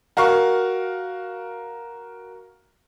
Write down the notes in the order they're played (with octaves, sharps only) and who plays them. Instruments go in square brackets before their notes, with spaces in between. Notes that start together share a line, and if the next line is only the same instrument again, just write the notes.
[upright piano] F#4 A#4 F5 C#6